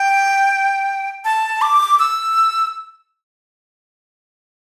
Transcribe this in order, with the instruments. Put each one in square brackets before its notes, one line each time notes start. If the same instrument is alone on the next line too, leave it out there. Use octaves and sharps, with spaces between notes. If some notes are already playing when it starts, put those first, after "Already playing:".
Already playing: [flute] G5
A5
D6
E6